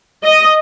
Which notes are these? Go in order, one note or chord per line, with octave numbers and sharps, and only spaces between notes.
D#5